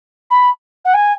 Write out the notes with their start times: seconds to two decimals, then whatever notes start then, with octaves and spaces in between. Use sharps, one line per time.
0.31 B5
0.85 F#5
0.94 G#5